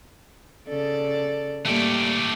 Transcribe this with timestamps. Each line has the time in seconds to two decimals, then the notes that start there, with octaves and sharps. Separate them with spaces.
0.68 C#3 A4 D5
1.66 A2 G3 A3 A#3 G4